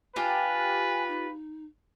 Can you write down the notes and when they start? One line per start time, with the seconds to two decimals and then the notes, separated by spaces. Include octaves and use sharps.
0.16 D4 F4 G4 B4 G#5
1.07 D#4